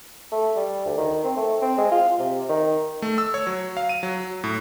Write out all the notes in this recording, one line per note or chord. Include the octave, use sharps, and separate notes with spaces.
A3
G3
D2
D#3
C4
A3
C4
G#3
F4
C3
D#3
A3
E6
C#5
F#3
F5
D#7
F#3
A2